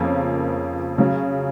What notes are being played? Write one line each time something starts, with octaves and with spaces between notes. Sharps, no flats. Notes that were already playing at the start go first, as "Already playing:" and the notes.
Already playing: F2 C#3 F3 A#3 C#4
C#3 F#3 C#4